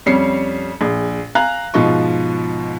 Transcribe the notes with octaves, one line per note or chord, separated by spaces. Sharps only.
F2 G3 C#4 C7 C#7
A#1 G#4
F5 G#5 A#5 F#6
G#2 B2 F3 F4 D#5 C#6